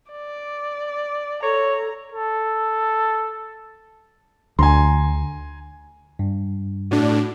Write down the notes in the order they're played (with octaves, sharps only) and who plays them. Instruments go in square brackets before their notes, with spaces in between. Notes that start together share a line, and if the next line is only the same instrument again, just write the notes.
[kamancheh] D5
[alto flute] A4 [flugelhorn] C#5 [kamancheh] A#5
[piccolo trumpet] A4
[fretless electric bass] D2 [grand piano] G#5 A#5 C6
[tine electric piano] G2
[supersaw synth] A2 D4 [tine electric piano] F#4